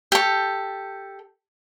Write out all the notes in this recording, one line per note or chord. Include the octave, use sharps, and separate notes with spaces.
G4 A4